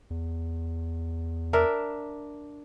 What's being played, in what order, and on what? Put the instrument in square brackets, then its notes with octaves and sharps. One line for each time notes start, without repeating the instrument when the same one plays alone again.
[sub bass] E2
[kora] D4 A#4 E5